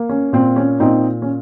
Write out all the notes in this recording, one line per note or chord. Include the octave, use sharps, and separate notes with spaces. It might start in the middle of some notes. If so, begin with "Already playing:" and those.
Already playing: A#3
C#4
A#2 C4
C#4
A#2 C4 D#4
C#4